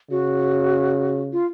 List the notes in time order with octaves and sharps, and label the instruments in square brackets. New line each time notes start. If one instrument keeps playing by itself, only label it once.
[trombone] C#3 [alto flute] F#4
[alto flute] F4